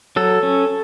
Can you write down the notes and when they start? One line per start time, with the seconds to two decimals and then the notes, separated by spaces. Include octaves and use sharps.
0.16 F#3 A4
0.43 C#4